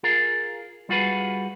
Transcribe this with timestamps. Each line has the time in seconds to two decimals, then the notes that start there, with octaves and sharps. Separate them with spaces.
0.03 F4 G#4 A#4
0.89 G3 F4 F#4 G#4 B4